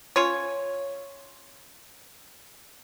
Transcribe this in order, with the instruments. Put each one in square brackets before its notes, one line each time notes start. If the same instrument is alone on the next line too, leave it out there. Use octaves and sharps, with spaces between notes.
[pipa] C#4 F4 C#5